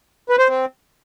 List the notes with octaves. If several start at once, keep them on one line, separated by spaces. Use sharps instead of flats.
B4
C5
C4